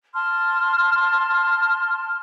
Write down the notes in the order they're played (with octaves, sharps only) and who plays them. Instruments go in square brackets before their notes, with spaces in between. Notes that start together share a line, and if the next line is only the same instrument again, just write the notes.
[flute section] A5 C6 F6